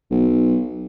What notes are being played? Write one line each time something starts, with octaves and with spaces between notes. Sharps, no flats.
B1